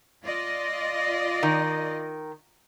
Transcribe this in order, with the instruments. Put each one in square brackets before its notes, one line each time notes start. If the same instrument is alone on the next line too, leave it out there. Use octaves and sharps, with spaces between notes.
[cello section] F4 D5 D#5
[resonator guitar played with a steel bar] D#3